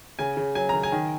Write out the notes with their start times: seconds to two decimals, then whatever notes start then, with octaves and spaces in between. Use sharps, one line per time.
0.19 C#3 G#5
0.37 C#3
0.55 F#3 G#5
0.69 C#3 A#5
0.83 G#5
0.92 D#3